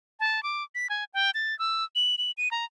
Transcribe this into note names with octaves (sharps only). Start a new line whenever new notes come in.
A5
D6
B6
G#5
G5
A6
E6
F#7
F#7
D#7
A#5